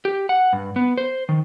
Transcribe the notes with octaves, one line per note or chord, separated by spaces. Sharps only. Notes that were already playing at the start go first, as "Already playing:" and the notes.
G4
F#5
G2
B3
C5
D#3